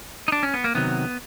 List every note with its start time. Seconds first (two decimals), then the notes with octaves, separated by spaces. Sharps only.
0.28 D#4
0.32 D4
0.43 C#4
0.54 B3
0.64 A#3
0.75 C3 D#3 F#3 B3